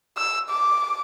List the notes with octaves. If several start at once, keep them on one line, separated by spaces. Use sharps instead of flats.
E6
D6